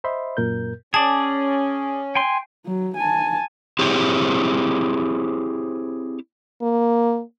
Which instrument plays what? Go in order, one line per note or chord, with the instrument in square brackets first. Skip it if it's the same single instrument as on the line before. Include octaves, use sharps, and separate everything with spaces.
[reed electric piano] C5 D#5 E5 B5 C6
F#2 A#2 A#4 G6
[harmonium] C#4 [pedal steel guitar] G#4 D5 [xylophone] A5
[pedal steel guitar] G5 G#5 C6
[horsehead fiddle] F#3
G#5 A5
[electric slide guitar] C4 E4 G4 G#4 C5 C#5
[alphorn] A#3